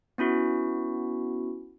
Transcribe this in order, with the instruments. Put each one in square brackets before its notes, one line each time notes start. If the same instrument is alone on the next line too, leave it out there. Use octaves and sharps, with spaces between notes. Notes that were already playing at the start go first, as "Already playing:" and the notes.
[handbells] B3 C#4 E4 F#4